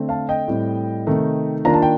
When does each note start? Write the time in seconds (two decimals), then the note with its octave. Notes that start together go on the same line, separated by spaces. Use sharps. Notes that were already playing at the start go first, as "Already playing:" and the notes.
Already playing: D3 A3 C4
0.09 F5 A5
0.29 D#5 G5
0.48 A2 G3 C4
1.07 C3 D#3 A3 D#4
1.65 D#3 A#3 D4 F4 A#5
1.74 A5
1.82 G5